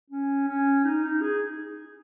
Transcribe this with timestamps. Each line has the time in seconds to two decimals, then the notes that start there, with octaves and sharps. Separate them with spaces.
0.10 C#4
0.48 C#4
0.84 D#4
1.04 D#4
1.22 G#4